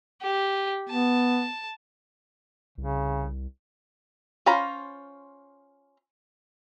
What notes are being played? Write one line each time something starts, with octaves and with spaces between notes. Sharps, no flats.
G4
B3 A5
C2 C#3
C#4 F4 C5 A#5 B5